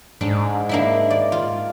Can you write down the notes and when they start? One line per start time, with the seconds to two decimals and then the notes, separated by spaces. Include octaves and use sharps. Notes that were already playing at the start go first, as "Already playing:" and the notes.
0.21 G#2 D4
0.69 A#3 D4 E4
1.10 D5
1.32 F4